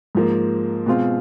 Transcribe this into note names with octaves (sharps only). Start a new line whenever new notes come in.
G#2 F3 A#3
B2 G#3 C4 F4